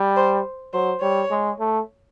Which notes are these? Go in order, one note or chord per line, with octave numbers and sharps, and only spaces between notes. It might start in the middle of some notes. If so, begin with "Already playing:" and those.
Already playing: G3
C5
F#3 C5
G3 C#5
G#3
A3